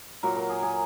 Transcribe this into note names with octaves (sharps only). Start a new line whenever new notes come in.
A#2 F#3 A#4
A#4
G#4
G#4